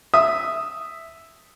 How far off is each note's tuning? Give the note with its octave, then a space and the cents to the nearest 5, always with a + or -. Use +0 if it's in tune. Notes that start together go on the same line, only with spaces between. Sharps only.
E5 +0 D#6 +0